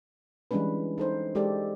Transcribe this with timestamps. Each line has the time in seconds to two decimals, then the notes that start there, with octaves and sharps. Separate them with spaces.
0.51 E3 G3 G#3 C#4 D4 B4
0.98 D#4 A4 C5
1.35 G#3 G4 A4 D5